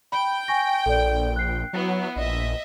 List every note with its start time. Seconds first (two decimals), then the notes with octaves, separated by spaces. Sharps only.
0.12 G5 B5
0.48 G#5 C#6 A#6
0.86 A#1 A4 D5
1.36 F#6 C7
1.73 F#3 B3 E4
2.16 A#1 D#5 E5